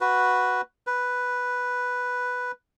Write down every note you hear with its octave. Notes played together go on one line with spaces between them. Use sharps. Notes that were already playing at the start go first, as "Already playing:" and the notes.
F#4 B4
B4